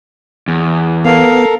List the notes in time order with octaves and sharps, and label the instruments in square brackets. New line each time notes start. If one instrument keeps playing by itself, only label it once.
[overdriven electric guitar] E2
[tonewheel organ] B3 [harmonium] A4 A#4 [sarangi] F5